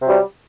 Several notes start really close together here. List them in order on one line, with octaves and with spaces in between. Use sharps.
C3 F#3 G3